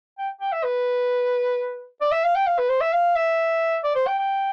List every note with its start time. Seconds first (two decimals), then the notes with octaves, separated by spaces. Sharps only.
0.18 G5
0.41 G5
0.52 E5
0.64 B4
2.01 D5
2.12 E5
2.24 F5
2.35 G5
2.47 F5
2.58 B4
2.69 C5
2.81 E5
2.93 F5
3.16 E5
3.84 D5
3.95 C5
4.07 G5
4.19 G5